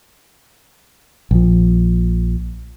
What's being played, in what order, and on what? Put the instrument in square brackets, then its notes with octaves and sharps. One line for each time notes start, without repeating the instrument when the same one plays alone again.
[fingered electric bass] A#1 F3